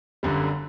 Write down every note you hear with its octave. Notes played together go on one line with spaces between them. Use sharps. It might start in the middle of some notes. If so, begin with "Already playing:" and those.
G1 F#2 D3 G3